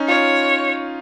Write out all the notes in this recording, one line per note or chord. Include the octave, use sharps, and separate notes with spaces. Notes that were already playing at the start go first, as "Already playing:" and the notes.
Already playing: C#4 D#4
F4 C#5